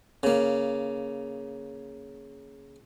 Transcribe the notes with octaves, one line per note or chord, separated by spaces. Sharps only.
C#3 A#3